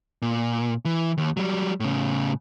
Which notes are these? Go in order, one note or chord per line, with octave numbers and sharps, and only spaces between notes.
A#2
E3
D#2
F#3 G3
A2 C#3